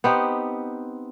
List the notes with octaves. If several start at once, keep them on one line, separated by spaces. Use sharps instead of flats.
B3 C4 D#4 G4